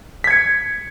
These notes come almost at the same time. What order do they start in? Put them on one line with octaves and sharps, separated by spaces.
B6 G#6 C#7